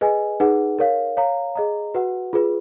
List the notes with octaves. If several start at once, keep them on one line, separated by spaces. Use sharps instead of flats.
G#4 B4 D#5 G#5
D#4 G#4 B4 F#5
A#4 C#5 F5
C#5 F5 A#5
G#4 D#5 A#5
F#4 B4 F#5
F4 G#4 B4